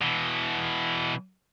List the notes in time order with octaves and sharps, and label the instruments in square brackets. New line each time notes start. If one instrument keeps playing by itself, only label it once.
[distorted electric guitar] B2 E3